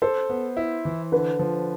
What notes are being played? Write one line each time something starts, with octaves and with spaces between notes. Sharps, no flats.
A4 C5
B3
E4
E3
D3 B4
F3